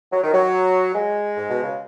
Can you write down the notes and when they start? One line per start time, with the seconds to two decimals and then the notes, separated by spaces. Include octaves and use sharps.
0.13 F#3
0.23 D#3
0.34 F#3
0.95 G#3
1.37 G#2
1.50 B2
1.63 C#3